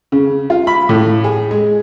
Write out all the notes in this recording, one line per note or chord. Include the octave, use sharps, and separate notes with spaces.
C#3
F4
B5
A2
G#4
G#3